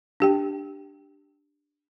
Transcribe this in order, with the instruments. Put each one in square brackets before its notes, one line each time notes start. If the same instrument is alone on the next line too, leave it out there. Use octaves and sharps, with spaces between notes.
[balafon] D4 G4 G5